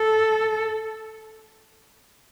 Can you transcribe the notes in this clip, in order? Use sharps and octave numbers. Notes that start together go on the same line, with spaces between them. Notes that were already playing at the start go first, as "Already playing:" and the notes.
Already playing: A4